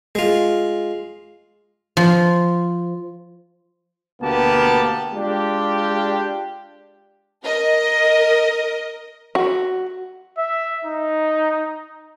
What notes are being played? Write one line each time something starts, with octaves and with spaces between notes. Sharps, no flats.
G#3 F4
F3
D2 B2 A#3 B3 G4 A5
G#3 D4 F4 G4
A#4 D#5
F#4
E5
D#4